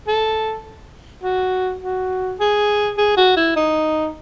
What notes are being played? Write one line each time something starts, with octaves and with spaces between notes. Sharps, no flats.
A4
F#4
F#4
G#4
G#4
F#4
E4
D#4